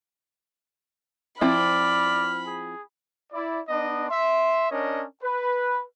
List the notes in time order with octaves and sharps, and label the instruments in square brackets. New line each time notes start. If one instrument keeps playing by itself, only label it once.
[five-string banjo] F3 C4 E4 [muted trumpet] D5 [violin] B5 [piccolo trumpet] F6
[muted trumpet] G#4
[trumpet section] E4 D5
B3 D4 D#4 D#5
E5 C6
C#4 D4 A#4 C#5 D#5
B4